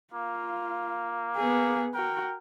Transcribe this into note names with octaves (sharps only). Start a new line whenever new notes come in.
A#3 F4
B3 G#4
F#4 A#4 G5